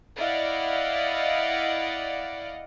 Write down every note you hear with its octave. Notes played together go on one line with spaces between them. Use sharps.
E4 D5 D#5 F5 F#5